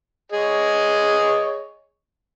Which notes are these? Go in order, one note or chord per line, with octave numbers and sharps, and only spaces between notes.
G#4 C#5 D#5